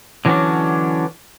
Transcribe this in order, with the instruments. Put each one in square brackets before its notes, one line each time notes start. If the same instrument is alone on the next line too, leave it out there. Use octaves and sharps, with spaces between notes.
[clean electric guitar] D3 E3 F#3 G3 C#4 D4